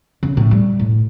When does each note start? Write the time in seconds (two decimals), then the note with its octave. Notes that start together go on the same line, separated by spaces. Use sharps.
0.23 C#3
0.37 A2
0.51 G3
0.79 A2